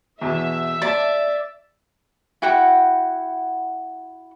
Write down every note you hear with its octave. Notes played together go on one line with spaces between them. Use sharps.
E2 B2 E5
D5 A5 A6
E4 F#4 F#5 G5